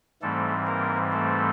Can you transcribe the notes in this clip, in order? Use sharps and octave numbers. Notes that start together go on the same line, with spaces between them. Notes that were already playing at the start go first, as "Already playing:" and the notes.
G#2 E3 G3 A3 C4 A4
A#3 A#4
A3 A4